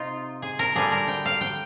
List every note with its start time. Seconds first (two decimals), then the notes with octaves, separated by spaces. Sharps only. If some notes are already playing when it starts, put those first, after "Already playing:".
Already playing: C3 D#4 F4
0.42 G#4
0.59 A#4
0.75 D3 G3 A#3 G#4
0.92 A#4
1.08 G5
1.25 F5
1.41 G5